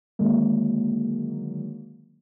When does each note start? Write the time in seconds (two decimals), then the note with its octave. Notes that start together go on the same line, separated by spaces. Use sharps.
0.19 D3 D#3 F#3 G#3 A#3